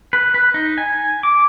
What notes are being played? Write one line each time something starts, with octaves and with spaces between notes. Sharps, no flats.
B4
B4
D#4
G#5
D6